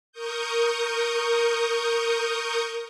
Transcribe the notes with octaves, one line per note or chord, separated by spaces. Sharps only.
A#4 C#6 D#6 G6